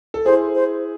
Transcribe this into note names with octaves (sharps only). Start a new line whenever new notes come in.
A4
E4 G#4 C5
C5